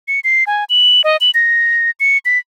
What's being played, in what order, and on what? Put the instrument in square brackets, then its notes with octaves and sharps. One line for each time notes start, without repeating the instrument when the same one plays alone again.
[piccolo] C#7
C7
G#5
F#7
D#5
F#7
A#6
C#7
B6